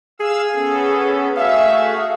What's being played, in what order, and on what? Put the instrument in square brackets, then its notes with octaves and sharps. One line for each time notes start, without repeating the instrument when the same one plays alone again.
[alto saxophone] G#4 [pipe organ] F5 E6
[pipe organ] B3 C#4 A4
[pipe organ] A3 F#4 G#4 [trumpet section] E5 [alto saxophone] F5